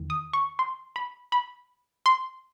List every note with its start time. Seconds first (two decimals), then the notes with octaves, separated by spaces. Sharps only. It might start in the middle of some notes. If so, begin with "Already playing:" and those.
Already playing: E2 D#3
0.10 D#6
0.33 C#6
0.59 C6
0.96 B5
1.32 B5
2.06 C6